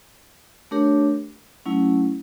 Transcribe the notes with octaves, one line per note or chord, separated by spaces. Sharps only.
A3 D4 G4 A#4 C#5
F#3 A3 C#4 E4